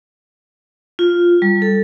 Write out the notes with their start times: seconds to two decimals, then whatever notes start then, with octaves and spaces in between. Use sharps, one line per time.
0.99 F4
1.42 G3
1.62 A4